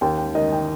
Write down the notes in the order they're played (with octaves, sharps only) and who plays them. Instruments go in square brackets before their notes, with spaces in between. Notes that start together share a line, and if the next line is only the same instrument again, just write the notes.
[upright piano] D#2 G5
G5
D#3 D#5
G5